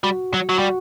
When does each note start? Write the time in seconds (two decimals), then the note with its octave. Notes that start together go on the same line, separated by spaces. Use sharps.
0.03 G3 F#4
0.34 F#3
0.49 F#3 F#4
0.59 G3